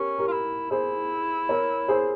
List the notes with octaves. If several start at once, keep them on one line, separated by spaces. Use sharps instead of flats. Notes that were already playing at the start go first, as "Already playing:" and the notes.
Already playing: C#4 G4 A#4
G4 A#4
F4
E4
E4 G#4 C5
A#4 C#5
G#4 C5